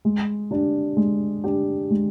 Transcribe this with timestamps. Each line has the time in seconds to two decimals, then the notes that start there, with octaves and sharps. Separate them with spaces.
0.05 G#3
0.51 D4 G4
0.97 G#3
1.44 D4 G4
1.90 G#3